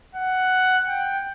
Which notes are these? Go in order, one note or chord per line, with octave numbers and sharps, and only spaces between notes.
F#5
G5